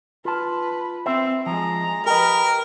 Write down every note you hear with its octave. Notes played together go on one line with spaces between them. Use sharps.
F4 B4 A5
C4 C5 E5
F3 G#3 A#5
G4 A#4 B4 D#5